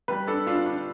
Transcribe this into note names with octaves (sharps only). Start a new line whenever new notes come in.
G3 B4
D4 A4
D4 F4
D4